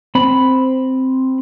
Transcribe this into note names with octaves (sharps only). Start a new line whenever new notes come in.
C4 B5